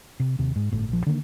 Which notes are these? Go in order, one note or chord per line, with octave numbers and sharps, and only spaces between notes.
C3
D#2 C3
G#2
G1 A2
A#1 F3
D3 D#3 A#3